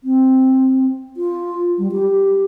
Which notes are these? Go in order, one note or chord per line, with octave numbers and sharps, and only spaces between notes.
C4
F4
G3
G4